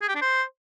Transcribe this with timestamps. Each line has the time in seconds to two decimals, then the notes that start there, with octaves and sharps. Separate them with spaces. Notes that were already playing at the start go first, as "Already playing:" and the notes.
0.02 G#4
0.08 G4
0.15 D4
0.21 C5